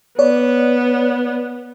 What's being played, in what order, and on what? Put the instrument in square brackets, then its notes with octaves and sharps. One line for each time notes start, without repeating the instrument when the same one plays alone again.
[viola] B3 [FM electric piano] C#5 D5